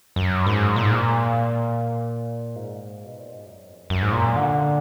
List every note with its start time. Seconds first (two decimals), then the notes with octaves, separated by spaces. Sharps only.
0.16 F#2
0.46 G#2
0.76 A#2
0.83 G#2
0.91 A#2
2.56 G#2
3.06 B2
3.20 A#2
3.32 G#2
3.46 F#2
3.68 F2
3.90 F#2
4.02 G#2
4.12 A#2
4.36 D3